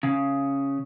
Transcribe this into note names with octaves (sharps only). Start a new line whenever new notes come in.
C#3